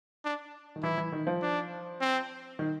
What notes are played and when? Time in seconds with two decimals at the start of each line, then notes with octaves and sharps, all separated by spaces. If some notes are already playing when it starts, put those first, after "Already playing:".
0.25 D4
0.76 D#3
0.83 E3 E4
0.98 E3
1.12 D#3
1.27 F3
1.42 D4
2.01 C4
2.59 D#3